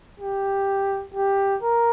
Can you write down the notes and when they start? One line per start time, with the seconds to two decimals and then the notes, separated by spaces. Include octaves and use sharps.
0.20 G4
1.14 G4
1.63 A#4